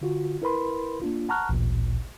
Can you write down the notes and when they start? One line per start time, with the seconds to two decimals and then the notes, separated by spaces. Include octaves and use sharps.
0.01 D3 F4 F#4
0.42 E4 A#4 B4 B5 C6
1.02 A#3 D4 F4
1.29 F#5 A5 A#5 C#6 F6 F#6
1.49 A1 D2 A#2